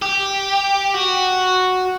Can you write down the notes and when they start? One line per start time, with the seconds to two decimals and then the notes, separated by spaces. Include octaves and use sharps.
0.02 G4
0.94 F#4